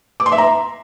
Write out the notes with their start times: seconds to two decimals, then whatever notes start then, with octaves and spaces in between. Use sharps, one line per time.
0.20 D6
0.26 C6
0.32 E5
0.38 A#5